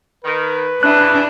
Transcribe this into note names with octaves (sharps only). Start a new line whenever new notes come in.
D#3 B4
C#3 E3 D4 F#6